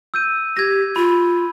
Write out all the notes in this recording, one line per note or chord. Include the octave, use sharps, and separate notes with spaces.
E6 G6 D#7
G4 G#6 A#6
F4 B5